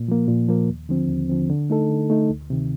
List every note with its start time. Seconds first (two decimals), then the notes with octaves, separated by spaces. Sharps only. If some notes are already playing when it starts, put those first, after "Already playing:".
Already playing: A#2
0.08 F3 A#3
0.28 A#2
0.48 F3 A#3
0.69 D#2
0.89 D3 F3 C4
1.09 D#2
1.29 D3 F3 C4
1.49 D3
1.70 A3 D#4 A4
1.90 D3
2.10 A3 D#4 A4
2.30 D2
2.50 C3 D#3